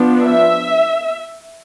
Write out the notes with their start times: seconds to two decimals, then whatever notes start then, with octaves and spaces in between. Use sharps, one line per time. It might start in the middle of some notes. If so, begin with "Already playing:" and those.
Already playing: F3 B3 D4
0.22 E5